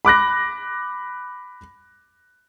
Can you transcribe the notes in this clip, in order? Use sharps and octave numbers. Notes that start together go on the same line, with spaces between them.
B5 D6 F#6 A#6